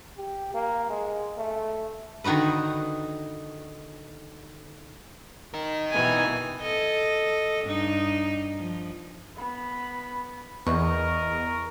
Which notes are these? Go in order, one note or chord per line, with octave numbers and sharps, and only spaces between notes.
G4
A#3
G#3
A3
D3 D#3 D#4 F#4 B4
D#4 A#4
B2 E3 G3 G#5
A4 D#5
G2 D#4
F3
B3 B5
E2 A#4 D#5 C#6